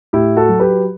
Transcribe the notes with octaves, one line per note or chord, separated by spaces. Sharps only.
A2 E4 G4
F#4 A4
F#3
G4 B4